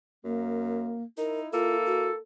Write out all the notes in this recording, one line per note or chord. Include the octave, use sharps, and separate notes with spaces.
F#2 A#3
D#4 E4 A#4
A#3 F4 A4
F#4